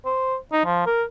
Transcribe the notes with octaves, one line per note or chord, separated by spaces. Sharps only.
C5
D#4
F3
A#4